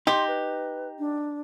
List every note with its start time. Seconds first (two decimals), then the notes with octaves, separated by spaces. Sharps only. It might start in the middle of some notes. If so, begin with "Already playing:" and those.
0.07 D#4 G4 C6
0.28 B4
0.99 D4